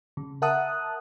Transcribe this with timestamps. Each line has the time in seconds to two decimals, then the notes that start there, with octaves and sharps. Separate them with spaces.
0.17 C#3
0.42 A#4 E5 F#5 A5 D#6 F#6